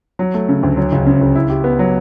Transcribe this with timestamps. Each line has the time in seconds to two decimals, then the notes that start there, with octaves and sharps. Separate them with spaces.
0.19 F#3
0.34 A3
0.49 C#3
0.63 D2
0.77 F#3
0.92 C#2
1.06 C#3
1.21 C#2
1.35 E4
1.50 G4
1.64 B3
1.79 F#3